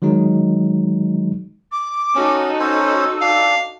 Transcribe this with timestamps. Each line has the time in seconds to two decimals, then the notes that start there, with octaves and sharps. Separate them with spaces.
0.02 D#3 F#3 G#3 D#4
1.71 D6
2.15 C#4 D#4 F#4 A4
2.60 C#4 C5 C#5 E6
3.21 D4 F5